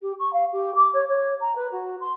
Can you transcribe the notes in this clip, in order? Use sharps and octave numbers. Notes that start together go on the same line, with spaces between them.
G4
C#6
F5
G4
D6
C#5
C#5
A#5
B4
F#4
C6